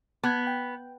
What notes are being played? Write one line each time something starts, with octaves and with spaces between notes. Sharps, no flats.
B3 A5 F#6 G#6
G5